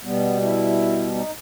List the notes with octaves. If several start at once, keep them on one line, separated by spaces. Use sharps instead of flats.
B2 G3 B3
E4
D#4